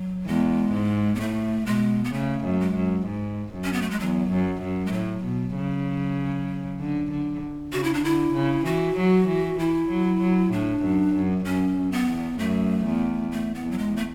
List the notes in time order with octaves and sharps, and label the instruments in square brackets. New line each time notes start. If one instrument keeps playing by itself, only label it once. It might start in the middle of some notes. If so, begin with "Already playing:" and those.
Already playing: [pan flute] F#3
[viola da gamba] E2 [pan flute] G#3
[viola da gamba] G#2
[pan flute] B3
[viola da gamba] A2 [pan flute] A3
[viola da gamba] B2 [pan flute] G#3
[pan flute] B3
[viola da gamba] C#3 [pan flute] A3
[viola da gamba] F#2
[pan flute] G#3
[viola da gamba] F#2
G#2
F#2
[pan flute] C#4
B3
A3
G#3
[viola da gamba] E2 [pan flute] F#3
[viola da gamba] F#2
F#2
[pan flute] G#3
[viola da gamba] A2 [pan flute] F#3
[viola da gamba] B2
C#3
D3
D3
[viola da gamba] C#3 [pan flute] F#4
[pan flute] E4
D4
[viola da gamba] D3 [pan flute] E4
[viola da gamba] C#3
[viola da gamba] E3 [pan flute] F#4
[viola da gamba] F#3
E3
[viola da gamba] E3 [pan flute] E4
[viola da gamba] F#3
F#3
[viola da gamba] A2 [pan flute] D4
[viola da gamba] F#2
F#2
[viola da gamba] F#2 [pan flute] C#4
[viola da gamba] F#2
[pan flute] B3
[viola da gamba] E2
[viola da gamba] F#2 [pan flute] A3
[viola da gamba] E2
[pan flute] A3
B3
[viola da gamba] E2
[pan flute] F#3
G#3
A3